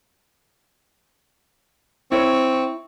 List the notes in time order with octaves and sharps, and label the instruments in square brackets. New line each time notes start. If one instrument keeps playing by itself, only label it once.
[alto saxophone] C4 [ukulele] E4 C#5 [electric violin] C#6